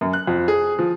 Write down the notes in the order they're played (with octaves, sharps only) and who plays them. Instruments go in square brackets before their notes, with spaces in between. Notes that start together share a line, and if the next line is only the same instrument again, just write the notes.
[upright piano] F#2
F#6
F2
G#4
F3